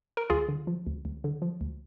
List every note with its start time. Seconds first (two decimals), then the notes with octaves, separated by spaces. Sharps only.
0.17 A#4
0.30 D2 F4 G#4
0.49 D3
0.67 F3
0.87 D2
1.05 D2
1.24 D3
1.42 F3
1.61 D2